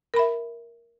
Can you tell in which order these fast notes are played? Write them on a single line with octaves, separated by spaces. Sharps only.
A#4 B5 E5